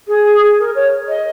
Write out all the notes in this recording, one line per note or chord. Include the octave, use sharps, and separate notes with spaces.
G#4
A#4
C#5
D#5